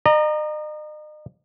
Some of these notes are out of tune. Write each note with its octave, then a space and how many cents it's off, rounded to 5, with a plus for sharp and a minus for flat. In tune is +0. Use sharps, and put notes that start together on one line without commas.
D#5 -40 A#5 +0